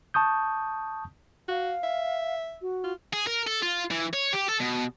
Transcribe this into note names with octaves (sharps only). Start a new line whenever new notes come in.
A5 C#6 D#6 G6
F#4 F5
E5
F#4
F4
G#4
A#4
A4
F4
E3
C#5
G4
A4
B2